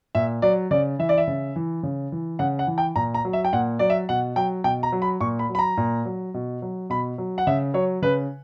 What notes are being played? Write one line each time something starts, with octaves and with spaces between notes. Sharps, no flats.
A#2 E5
F#3 D5
C#3 D5
E3 E5
D5
E5
C#3
E3
C#3
E3
C#3 F#5
F#5
E3
G5
A#2 A#5
A#5
F#3
E5
G5
A#2 F#5
F#3 D5
E5
B2 F#5
F#3 G5
B2 G5
A#5
F#3
B5
A#2 C#6
B5
F#3
B5
A#5
A#2
F#3
B2
F#3
B2 B5
F#3
F#5
C#3 E5
F#3 C#5
C#3 B4